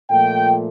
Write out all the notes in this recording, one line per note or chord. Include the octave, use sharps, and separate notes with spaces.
A#2 F3 A3 G5